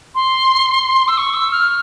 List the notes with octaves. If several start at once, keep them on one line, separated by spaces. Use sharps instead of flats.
C6
E6
C#6
E6
F6